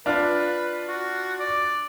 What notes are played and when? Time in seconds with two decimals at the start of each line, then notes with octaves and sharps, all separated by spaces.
0.06 D4 F4 B4 F6
0.88 F#4
1.40 D5